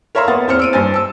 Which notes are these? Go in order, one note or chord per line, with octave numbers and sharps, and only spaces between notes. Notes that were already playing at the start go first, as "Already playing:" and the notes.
A#4 C#5 E5 F5 A#5 C6
B3 A#4 F#5 D#6 A6
E2 C4 C5 F6 C#7
E6 D7 D#7
G2 C5 G#5 A6
A5 E6